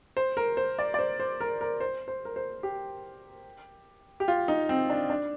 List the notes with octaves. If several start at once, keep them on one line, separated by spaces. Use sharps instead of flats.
C5
A#4
C5
D5
D5
C5
C5
A#4
A#4
C5
C5
A#4
C5
G4
G4
F4
D#4
C4
D4
D4